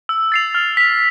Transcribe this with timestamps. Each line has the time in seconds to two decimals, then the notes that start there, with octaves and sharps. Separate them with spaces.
0.09 E6
0.32 A6 C7 F7
0.55 F6
0.77 B6 F7